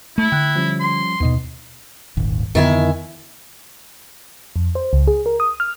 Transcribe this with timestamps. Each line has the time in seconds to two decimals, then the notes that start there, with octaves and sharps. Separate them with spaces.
0.18 A3 E4
0.32 D3 G5 F#6
0.56 F3 G3 C#4
0.80 C6
1.20 D#2 B2 B3 D#4 D#5
2.17 D#1 G#1 D#2
2.55 F2 D3 D#3 B3 E4 G#5
4.56 F2
4.75 C5
4.93 C#2
5.07 G#4
5.26 A#4
5.40 D#6
5.60 F6